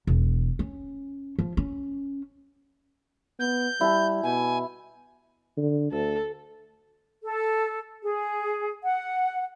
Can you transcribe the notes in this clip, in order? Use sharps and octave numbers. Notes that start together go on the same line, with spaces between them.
E1
C#4
F3
C#4
B3 G6
G3 E4 A5
B2 G#5
D3
D2 A4
A4
G#4
F#5